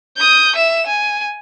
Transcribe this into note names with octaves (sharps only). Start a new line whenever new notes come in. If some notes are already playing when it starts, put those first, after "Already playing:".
D#6 G6
E5 E7
G#5